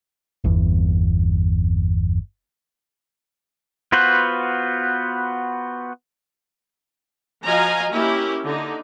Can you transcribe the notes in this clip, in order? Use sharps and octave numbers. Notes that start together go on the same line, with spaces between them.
G1 E2
B3 F4 F#4 B4 C5
F3 F#4 D#5 F5 G#5 A#5
A#3 C#4 E4 G4
D3 D#4